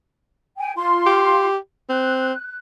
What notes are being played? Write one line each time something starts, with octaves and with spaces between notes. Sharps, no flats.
G5 G#5
F4 C6
G4
C4 F#6